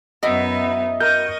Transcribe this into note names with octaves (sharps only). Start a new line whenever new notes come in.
F#2 B3 D#4 E4 F#4 D#5
A#4 D#5 C#6 G6